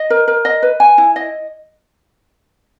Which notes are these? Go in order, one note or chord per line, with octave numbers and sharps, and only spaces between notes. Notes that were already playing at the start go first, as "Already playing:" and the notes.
Already playing: D#5
A#4
A#4
D#5
B4
G#5
E4
D#5